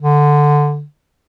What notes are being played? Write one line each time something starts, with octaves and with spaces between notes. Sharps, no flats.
D3